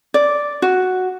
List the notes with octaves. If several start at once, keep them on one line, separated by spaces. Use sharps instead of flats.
D5
F#4